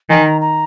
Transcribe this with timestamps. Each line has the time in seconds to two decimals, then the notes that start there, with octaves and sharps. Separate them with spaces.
0.09 D#3 G#5
0.25 A#5
0.41 A#5